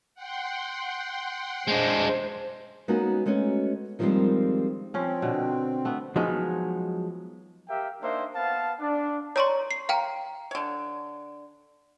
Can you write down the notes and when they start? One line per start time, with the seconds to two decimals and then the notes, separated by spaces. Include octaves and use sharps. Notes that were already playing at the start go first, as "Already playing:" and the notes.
0.15 F#5 G5 C6
1.68 G#3 D4 C5
2.88 G#3 A#3 B3 C#4 D#4 F#4
3.26 G#3 A3 B3 C#4 F#4
3.99 D#3 F3 G3 G#3 A#3 C4
4.94 F3 C4 C#4
5.22 B2 D3
5.85 A3 B3
6.16 F3 F#3 G#3 B3 D#4
7.68 G4 A#4 E5 F5 G5
8.01 A#3 D4 D#4 C5 E5
8.35 B3 F5 A5
8.80 D4
9.36 A#4 C#5 D5 A#5 C6 C#6
9.71 C7
9.89 A#4 F5 G5 A#5
10.51 D3 C#5